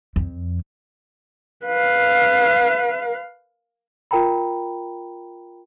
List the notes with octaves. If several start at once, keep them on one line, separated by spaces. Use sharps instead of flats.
F2
B4 F5
F4 A#4 G5 A#5 B5